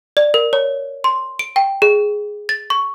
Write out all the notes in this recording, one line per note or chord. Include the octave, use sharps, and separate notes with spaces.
D5
A#4
C#5
C6
D7
G5
G#4
A6
C#6